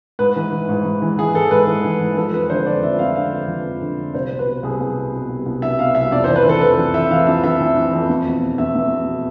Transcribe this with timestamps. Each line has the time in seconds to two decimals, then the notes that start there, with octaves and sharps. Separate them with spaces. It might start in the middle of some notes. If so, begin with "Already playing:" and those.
0.19 G#2 B4
0.36 E3
0.52 E3
0.69 G#2
0.85 G#2
1.02 E3
1.18 E3 G#4
1.34 G#2 A4
1.51 G#2 B4
1.67 E3
1.84 E3
2.00 G#2
2.17 F3 A4
2.34 F2 B4
2.50 D3 C5
2.66 F2 D5
2.83 F3 E5
2.99 F2 F5
3.16 D3 F5
3.33 F2
3.48 F3
3.65 F2
3.81 D3
3.98 F2
4.14 C2 C5
4.31 B2
4.39 B4
4.46 B2
4.63 C2 G#4
4.80 C2
4.96 B2
5.13 B2
5.29 C2
5.46 C2
5.62 B2 E5
5.79 B2 F5
5.95 C2 E5
6.11 F2 D5
6.24 C5
6.28 E3
6.36 B4
6.45 E3 A4
6.61 F2 B4
6.77 F2
6.94 E3 E5
7.10 E3 F5
7.27 F2 E5
7.44 F2 E5
7.60 E3
7.77 E3
7.93 F2
8.09 E2
8.25 B2
8.42 B2
8.58 E2 E5
8.75 E2
8.92 B2
9.07 B2